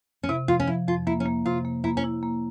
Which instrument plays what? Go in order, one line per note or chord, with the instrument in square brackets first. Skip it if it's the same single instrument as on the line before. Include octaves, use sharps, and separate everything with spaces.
[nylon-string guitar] C#4
[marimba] C3 [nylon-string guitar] E4
[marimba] F3 [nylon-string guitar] F4
[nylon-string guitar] C#4
[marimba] F3 [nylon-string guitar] E4
[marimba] F2 [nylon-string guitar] F4
[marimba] A#3 [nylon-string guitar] E4
[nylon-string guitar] C#4
[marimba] A#3
[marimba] C3 [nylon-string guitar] F4
[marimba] A#3
[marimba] A#3 [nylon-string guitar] E4
[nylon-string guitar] C#4
[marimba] E4
A#3